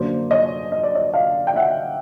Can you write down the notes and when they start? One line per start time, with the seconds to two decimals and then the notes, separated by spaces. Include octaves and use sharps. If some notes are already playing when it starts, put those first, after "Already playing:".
Already playing: F#2 D3 F#3 A#3 C5 D5
0.31 C#5 D#5
0.72 D#5
0.83 D5
0.95 C#5 D#5
1.14 D#5 F5
1.47 G5
1.56 E5 F#5